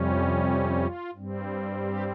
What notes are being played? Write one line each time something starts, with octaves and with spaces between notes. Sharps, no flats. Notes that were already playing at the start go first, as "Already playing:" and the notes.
Already playing: F2 C3 G3 C#4
G4
G4
F4
G2 G3 C4
G4